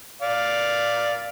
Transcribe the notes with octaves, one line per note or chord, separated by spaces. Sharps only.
D5 F5